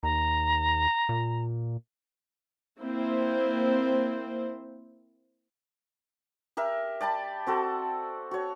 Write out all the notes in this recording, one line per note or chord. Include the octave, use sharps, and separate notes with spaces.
D#2 A#5
A#2
A#3 C4 E4 C5
G4 A#4 E5
D5 G5 A5 B5
C4 F#4 A4
F#4 C#5